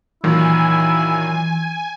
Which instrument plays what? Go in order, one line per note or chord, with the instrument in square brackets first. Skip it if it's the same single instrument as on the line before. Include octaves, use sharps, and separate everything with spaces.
[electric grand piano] A#2 D#3 F#3 [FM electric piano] E3 [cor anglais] E4 [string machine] G#5